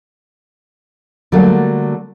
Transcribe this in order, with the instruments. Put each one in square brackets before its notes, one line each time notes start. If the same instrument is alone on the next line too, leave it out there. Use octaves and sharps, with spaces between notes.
[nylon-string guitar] D3 F#3 G3 A3 A#3 D4